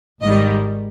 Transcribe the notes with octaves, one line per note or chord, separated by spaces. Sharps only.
G#1 G#2 D#3 G3 D#5